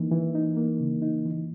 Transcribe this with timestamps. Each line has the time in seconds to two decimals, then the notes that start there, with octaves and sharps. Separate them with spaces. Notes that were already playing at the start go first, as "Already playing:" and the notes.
Already playing: E3 A#3 D#4
0.12 E3
0.35 D#4
0.57 A#3
0.80 C#3
1.02 D#4
1.25 E3